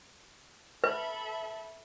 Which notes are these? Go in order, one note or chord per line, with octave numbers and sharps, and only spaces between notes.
A4 B4 E5 B5